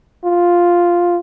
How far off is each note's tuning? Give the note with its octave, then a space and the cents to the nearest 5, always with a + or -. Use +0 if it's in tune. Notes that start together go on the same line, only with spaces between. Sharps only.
F4 +0